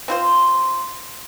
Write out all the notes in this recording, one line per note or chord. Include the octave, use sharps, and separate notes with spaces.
C4 F4 C5